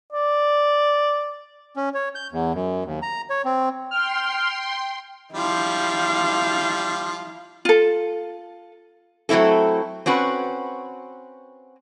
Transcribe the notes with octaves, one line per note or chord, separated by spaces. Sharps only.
D5
C#4
C#5
G6
E2
F#2
D#2
A#5
C#5
C4
G5 C6 F6
F3 G3 E4 F5
F4 A4
F#3 A3 C4 E4 A4
C4 C#4 F#4 B4